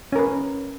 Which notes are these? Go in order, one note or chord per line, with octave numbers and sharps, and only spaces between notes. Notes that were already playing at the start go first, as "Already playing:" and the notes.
C#4 A#4 B4